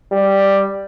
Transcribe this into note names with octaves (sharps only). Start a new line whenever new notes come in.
G3